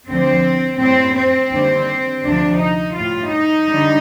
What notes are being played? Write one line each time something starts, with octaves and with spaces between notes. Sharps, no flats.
D2 D3 F3 C4
A2 G3 C4
C4
D#2 D3 G3
D2 C3 F3 D4
D#4
A2 G3 F4
D#4
D3 G3